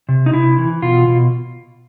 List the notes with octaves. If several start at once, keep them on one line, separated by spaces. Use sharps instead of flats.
C3
D#4
C3 E4
E3
B2 F4
B2